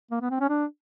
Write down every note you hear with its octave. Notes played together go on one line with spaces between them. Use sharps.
A#3
B3
C4
C#4
D4